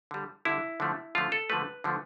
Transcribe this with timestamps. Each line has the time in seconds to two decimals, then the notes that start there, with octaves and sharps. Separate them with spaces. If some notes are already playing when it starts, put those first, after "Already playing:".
0.11 D3 G3
0.45 D3 G3 E4
0.80 D3 F3 A3
1.15 D3 F3 A3 F4
1.32 A4
1.50 D3 F3 A3 B4
1.84 D3 F3 A3